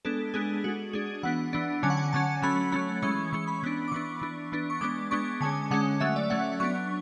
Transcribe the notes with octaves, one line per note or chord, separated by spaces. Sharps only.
G#3 B3 D4 A4
G#3 B3 D4 G#4
G#3 D4 F#4
G#3 D4 G#4
E3 B3 D4 F#5
E3 B3 D4
D3 F#3 C#4 G#5
F#5
G#5
D3 F#3 C#4 A5
F#3 A3 C#4 B5
F#3 A3 C#4 B5
E3 G#3 C#4 C#6
E3 G#3 C#4 C#6
B5
E3 B3 D4
D6
E3 B3 D4 C#6
E3 B3 D4
E3 B3 D4
C#6
G#3 B3 D4 D6
G#3 B3 D4 C#6
D3 G#3 C#4 G#5
D3 G#3 C#4 F#5
F#3 A3 C#4 E5
D5
F#3 A3 C#4 F#5
F#3 B3 D4 C#6